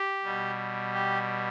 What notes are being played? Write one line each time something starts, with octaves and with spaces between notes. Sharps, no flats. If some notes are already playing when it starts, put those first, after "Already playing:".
Already playing: G4
B2 G3
G4